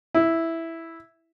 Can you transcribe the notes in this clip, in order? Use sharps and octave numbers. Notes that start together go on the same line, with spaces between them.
E4